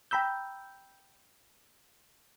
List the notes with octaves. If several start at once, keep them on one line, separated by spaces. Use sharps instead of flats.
G5 A#5 B5 E6 G6